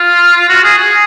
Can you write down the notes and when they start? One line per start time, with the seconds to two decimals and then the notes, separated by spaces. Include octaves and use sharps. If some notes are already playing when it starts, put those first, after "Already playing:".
Already playing: F4
0.49 F#4
0.64 G#4
0.79 G#4